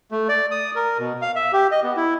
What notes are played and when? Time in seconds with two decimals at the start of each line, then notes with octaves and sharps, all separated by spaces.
0.11 A3
0.29 D5
0.51 D#6
0.76 A#4
0.99 B2
1.22 F5
1.36 E5
1.53 G4
1.71 D#5
1.83 B3
1.97 E4